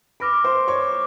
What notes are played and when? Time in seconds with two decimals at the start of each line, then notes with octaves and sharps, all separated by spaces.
0.20 B4 B5 D6 F6 A#6 D7
0.44 C5 C6
0.68 C#5 C#6
0.92 D6